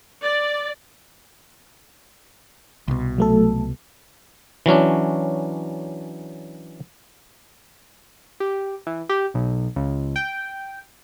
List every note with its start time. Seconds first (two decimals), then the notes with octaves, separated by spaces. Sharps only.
0.21 D5
2.88 C2 B2
3.18 F#3 A3 A4
4.66 E3 F#3 C#4 D4
8.40 G4
8.87 E3
9.09 G4
9.34 B1
9.76 C#2
10.16 G5